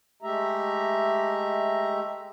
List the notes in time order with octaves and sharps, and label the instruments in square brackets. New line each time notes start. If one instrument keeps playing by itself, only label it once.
[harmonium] G#3 A3 G4 E5 A#5